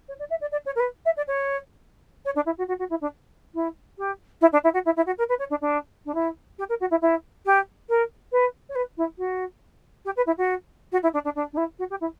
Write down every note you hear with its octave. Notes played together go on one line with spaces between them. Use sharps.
C#5
D5
E5
D5
D5
C#5
A#4
B4
E5
D5
C#5
C#5
D4
E4
F#4
F#4
F#4
E4
D4
E4
G4
E4
D4
E4
F#4
E4
E4
F#4
A#4
B4
C#5
D4
D4
D4
E4
G4
A#4
F#4
E4
E4
G4
A#4
B4
C#5
B4
E4
F#4
G4
B4
E4
F#4
F#4
E4
D4
D4
D4
D4
E4
F#4
G4
E4